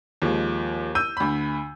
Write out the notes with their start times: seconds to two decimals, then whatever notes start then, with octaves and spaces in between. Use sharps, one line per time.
0.22 D#2 F3 G#3
0.95 E6 G6 D#7
1.17 D2 B5